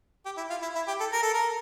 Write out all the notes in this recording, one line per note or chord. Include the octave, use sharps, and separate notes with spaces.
G4
E4
F4
E4
E4
G4
A4
A#4
A4
A#4